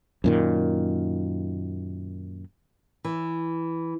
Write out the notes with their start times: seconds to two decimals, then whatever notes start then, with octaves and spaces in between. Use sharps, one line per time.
0.24 F#2 A#2 D#3
3.05 E3